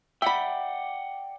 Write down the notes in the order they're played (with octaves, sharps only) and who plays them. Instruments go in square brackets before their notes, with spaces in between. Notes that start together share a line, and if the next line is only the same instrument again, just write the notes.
[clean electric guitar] D5 F#5 G5 [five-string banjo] E5 B5